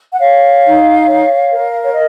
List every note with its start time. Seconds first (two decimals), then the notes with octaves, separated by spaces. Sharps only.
0.11 F#5
0.20 C#5 F5
0.64 D#4
1.07 C#5
1.51 A#4
1.83 C#5
1.93 D#5